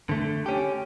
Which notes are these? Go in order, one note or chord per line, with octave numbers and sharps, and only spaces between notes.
D3 A3
C#4 G4